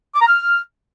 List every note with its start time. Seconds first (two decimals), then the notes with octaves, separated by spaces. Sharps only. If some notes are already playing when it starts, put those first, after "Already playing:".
0.15 D6
0.21 A#5
0.27 F6